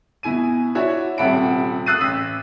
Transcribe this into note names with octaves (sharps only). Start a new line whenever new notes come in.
B2 E4 G#5 D#7
D4 E4 F#4 C#5 E5
D#1 C3 E5 F#5 B5 D7
D#6 E6 F#6 A6 C7 D#7
A1 E6 B6 D#7